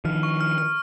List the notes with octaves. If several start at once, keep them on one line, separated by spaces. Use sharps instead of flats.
D#3 F3 F6
C#6
F6
F6